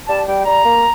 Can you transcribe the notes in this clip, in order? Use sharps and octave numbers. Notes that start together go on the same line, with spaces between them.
G3 A5
G3 G5
G3 A#5
A#3